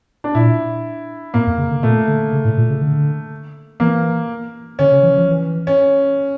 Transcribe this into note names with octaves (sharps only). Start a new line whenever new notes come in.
D4
A#2 E4
A2 A#3
F2
C#3
D3
A#2 A3
D3
C#3
A2
A#2
C#3
D3
E3 A#3
D3 C#4
C#3
E3
F3
E3
C#4